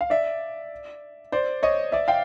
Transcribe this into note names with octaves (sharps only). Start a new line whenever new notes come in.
F5
D5 E5
C5 D5
C#5 D#5
D5 E5
F5 G5